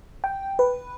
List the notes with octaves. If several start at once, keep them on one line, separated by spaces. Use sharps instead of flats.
G5
B4